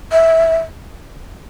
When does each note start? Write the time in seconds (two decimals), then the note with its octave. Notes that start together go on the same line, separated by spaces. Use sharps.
0.12 E5